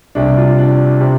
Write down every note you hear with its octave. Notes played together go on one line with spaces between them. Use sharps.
C2 C3 D4
F4
D4
C3 C4